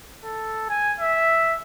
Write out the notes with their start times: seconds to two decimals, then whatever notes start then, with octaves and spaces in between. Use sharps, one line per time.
0.24 A4
0.69 G#5
1.00 E5